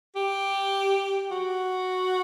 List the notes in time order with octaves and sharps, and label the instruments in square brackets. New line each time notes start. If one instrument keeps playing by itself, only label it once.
[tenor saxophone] G4
F#4